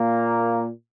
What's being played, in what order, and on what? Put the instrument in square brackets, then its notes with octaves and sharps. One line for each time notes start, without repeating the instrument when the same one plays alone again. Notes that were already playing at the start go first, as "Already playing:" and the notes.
Already playing: [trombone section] A#2 A#3